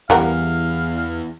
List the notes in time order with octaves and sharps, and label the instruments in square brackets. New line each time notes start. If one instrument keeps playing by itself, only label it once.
[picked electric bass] E2 E3 [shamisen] G3 A#4 F#5 [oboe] F5